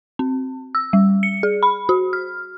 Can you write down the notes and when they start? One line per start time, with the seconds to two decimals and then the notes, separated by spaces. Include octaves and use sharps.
0.19 C4
0.75 E6
0.93 G3
1.23 C#7
1.43 G#4
1.63 B5
1.89 F#4
2.13 F6